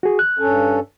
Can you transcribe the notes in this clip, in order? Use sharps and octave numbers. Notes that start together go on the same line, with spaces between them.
F#4 G#4
F#6
G2 C#4 A4